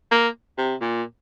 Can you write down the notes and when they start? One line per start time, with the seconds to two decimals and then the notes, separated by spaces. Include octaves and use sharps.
0.11 A#3
0.58 C3
0.81 A#2